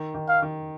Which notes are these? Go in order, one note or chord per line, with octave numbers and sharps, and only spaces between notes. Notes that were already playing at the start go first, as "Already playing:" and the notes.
Already playing: D#3
D#3
F5
D#3